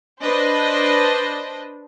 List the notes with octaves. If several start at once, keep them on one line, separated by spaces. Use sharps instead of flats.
D4 B4 C5 D#5